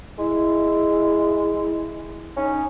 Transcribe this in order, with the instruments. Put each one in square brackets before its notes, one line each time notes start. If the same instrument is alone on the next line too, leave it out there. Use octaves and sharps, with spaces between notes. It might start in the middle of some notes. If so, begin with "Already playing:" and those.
[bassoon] G#3 [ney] E4
[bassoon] C#4 [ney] D#4